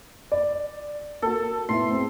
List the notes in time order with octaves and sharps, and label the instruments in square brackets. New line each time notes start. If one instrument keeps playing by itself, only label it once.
[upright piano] D5
[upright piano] A#3 F#4 [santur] A4
[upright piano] A2 B3 E5 [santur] C6
[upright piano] C4 G#4